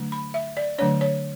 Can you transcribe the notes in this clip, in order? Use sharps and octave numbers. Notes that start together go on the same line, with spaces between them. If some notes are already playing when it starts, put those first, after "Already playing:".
Already playing: D3 F#3 A3 D4
B5
E5
D5
D3 F#3 A3 D4 C#5
C#5